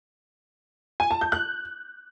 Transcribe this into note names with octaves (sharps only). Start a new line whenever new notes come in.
G#5
A5
G6
F#6